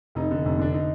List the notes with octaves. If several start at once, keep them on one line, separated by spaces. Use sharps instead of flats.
F1 D#4
D3
F1
D3 D4
D#4